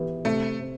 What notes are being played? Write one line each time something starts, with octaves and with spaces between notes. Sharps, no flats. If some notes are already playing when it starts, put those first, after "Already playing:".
Already playing: E3 B3 E4 G4 B4
C3 A3
C4